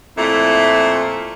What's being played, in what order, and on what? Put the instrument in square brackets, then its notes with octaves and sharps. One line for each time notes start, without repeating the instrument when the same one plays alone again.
[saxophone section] F2 A#2 A3 E4